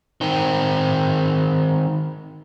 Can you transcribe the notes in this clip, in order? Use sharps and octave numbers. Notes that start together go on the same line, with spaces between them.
D#3 C4